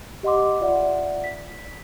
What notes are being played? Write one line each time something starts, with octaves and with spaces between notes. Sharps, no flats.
G4 D#5 F#5 C6 D6
F4 D5 E5 F#5
B6